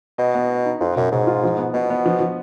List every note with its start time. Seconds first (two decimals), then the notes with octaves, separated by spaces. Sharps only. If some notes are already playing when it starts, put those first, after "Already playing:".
0.18 B2 D#5
0.35 B3
0.50 D#5
0.65 D#4
0.80 F2 F4
0.96 F#2 B2
1.12 G#2 B2
1.27 F4
1.43 F3
1.58 B3
1.73 B2 B3
1.90 B3
2.06 F3
2.20 F3